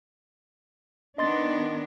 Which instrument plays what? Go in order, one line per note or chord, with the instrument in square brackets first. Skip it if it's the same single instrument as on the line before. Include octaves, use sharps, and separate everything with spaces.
[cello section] D#3 B3 D4 [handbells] D#5 C6 A6